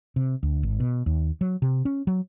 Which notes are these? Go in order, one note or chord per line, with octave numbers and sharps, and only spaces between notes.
C3
D2
G#1
B2
D#2
F#3
C3
C#4
F#3